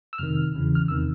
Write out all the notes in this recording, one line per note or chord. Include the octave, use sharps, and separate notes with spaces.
E6
F2 C3 D#3 F6
E2 C#3 E3
F6
E2 C3 D#3 E6